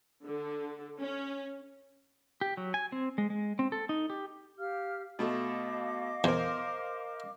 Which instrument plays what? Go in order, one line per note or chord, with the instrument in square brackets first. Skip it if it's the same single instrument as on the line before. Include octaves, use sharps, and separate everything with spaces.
[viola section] D3
C#4
[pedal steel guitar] G4
F#3
G#5
C4
G#3
G#3
C4
A4
D#4
G4
[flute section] G4 F5 F6
[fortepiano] B2 A3 A4 [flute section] D#5 F5 D6
[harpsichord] E2 [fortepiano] A#4 C5